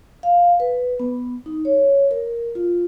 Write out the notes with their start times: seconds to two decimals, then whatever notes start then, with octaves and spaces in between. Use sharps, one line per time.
0.23 F5
0.60 B4
1.00 B3
1.46 D#4
1.65 C#5
2.11 A#4
2.55 F4